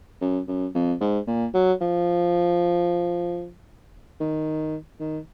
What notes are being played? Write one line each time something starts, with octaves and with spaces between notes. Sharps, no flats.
F#2
F#2
F2
G#2
A#2
F#3
F3
D#3
D#3